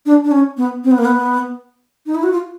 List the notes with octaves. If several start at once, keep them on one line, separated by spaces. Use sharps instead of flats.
D4
D4
C#4
B3
C4
B3
A#3
B3
D#4
E4
F#4
F4